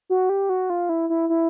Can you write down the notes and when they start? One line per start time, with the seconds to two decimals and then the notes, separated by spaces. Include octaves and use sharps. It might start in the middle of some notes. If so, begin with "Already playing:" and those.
0.10 F#4
0.29 G4
0.49 F#4
0.70 F4
0.89 E4
1.10 E4
1.29 E4